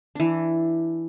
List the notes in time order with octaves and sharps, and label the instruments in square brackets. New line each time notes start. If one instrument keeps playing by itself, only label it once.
[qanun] E3 D4